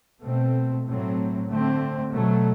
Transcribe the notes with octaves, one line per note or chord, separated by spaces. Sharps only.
B2 A3 C4
A2 F#3 A3 C4
D3 A3 C4
B2 F#3 A3